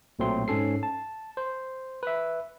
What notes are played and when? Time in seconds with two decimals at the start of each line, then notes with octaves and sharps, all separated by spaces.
0.19 B1 A#2 F#3 A3 C4 C6
0.48 G#2 C#4 A4 C7
0.83 A5
1.37 C5
2.03 B4 E5